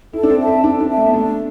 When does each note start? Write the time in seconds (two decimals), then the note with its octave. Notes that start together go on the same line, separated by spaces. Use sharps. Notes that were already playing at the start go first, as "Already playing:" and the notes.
0.13 E4 A4
0.23 D4
0.30 C4
0.38 E5 A5
0.47 C4
0.64 D4 A4
0.81 D4
0.89 E5 A5
0.97 A3
1.06 B3
1.14 A3 D4